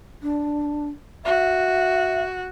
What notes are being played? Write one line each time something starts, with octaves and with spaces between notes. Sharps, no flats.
D4
F#4 E5